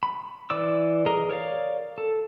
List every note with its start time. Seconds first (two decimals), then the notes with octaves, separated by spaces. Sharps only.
0.03 B5
0.50 E3 D5 D6 E6
1.06 G#4 A#4 D#5 A#5
1.29 A#4 C#5 D5 F5
1.98 A4